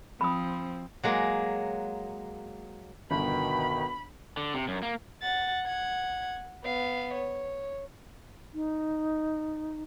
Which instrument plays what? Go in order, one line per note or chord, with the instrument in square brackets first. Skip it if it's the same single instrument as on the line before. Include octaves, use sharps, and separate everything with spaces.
[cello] F3 C4 [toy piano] B5 D#6
[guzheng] F#3 G#3 A#3
[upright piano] G1 [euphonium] B2 [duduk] D#3 [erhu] B5
[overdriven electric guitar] D3
C3
F#2
A#3
[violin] F#5 A6
F#5 G#6
B3 F5
C#5
[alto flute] D#4